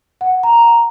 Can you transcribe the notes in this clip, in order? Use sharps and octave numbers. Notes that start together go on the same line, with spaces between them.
F#5
A#5